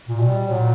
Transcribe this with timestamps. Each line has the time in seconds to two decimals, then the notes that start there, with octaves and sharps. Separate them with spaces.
0.08 A#2
0.19 B2 G3
0.47 A#2 F#3